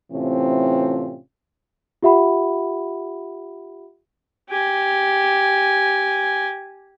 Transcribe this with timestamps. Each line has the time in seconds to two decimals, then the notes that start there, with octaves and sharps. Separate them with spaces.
0.12 A2 C3 E3 C4 C#4 F4
2.03 F4 G4 E5 F#5 B5
4.50 G4 G#5